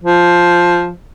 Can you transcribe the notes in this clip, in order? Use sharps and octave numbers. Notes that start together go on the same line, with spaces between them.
F3